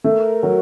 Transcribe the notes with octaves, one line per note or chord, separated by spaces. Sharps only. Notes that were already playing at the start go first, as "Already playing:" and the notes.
A3 A#4
F#3 F#4